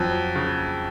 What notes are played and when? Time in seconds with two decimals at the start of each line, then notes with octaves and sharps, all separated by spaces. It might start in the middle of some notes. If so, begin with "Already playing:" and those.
Already playing: F2 F#3
0.35 C#3